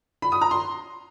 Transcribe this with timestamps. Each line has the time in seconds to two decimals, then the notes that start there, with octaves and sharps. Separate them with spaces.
0.22 B5
0.32 D#6
0.41 A#5
0.51 C6